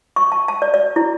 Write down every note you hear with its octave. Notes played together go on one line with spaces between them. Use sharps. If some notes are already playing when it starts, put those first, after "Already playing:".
C#6
A5
A5
D5
D5
E4